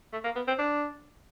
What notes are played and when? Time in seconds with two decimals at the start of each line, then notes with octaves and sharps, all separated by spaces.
0.13 A3
0.24 A#3
0.36 B3
0.48 C4
0.59 D4